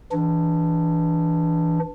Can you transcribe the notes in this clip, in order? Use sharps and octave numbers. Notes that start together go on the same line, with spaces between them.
E3 D4